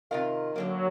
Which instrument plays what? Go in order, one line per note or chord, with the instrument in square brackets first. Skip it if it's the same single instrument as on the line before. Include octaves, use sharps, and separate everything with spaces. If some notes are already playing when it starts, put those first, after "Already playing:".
[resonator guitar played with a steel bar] C3 F4 F5 [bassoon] D#3
[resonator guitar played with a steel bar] F#2 D3 A#3 [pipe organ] F#3